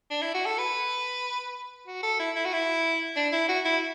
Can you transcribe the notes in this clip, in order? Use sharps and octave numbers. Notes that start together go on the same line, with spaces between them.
D4
E4
F#4
A4
B4
F#4
A4
E4
E4
F#4
E4
D4
E4
F#4
E4